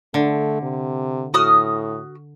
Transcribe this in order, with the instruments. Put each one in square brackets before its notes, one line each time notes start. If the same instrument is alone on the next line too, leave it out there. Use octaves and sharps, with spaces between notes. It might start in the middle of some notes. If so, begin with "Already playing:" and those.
[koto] D3 [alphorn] A3
[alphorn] C3
[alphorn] A2 [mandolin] F#4 D#6 F6